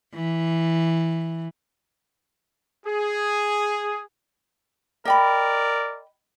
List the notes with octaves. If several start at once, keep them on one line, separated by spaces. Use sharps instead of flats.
E3
G#4
A#4 D5 D#5 G5 B5